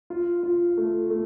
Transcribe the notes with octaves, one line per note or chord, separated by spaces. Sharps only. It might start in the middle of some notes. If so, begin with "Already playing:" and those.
F4
F4
A3
A3